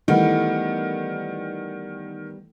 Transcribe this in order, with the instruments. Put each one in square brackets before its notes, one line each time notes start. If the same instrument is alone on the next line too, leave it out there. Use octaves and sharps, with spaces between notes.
[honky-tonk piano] D#3 [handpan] E3 A3 [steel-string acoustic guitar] G3 B3 [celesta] D#5 F#5 B5